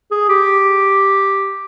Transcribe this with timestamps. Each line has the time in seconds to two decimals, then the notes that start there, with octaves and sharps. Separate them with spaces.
0.11 G#4
0.29 G4